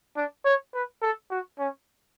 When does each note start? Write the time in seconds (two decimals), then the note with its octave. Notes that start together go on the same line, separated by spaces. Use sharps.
0.17 D4
0.45 C#5
0.74 B4
1.02 A4
1.30 F#4
1.59 C#4